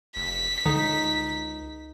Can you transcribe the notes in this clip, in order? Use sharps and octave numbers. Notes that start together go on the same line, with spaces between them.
F1 B6
C#2 D3 D#4